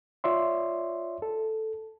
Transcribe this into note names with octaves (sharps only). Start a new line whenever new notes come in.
F4 C#5 D5 E5 C6
A4